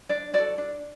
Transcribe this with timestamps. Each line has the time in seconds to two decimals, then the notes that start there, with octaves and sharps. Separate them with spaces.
0.09 D4 D5
0.33 F#4 A4 D5
0.58 D4